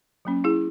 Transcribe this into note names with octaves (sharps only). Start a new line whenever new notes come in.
F#3 A#3 C#4
E4 G#4